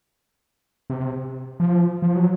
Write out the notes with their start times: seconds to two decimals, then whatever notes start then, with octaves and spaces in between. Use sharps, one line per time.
0.90 C3
1.60 F3
2.02 F3
2.16 F#3